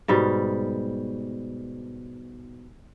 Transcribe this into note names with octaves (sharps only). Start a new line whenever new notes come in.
G#2 B2 G3